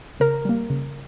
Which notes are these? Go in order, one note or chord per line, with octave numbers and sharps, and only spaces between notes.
C#3 A#4
G3 A#3
C#3